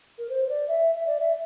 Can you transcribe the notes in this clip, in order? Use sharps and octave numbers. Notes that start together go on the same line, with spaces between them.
A#4
C5
C5
D5
E5
E5
D5
E5